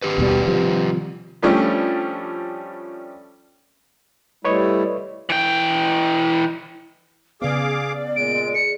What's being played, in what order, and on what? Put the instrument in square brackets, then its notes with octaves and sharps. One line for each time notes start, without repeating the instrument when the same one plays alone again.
[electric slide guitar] D#3 G4 B4
[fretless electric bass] D#2 B2 G3
C3 F3 G3
[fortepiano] F3 G3 A3 C#4 D4
[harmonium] G3 A3 E4 [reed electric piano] B4 C#5 D#5
[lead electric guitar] E3 G5
[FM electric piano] C#3 B3 [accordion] G#4 F5 D6 [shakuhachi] D5
[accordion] A#2 G#3 [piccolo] D7
[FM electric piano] G#4 [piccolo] C#7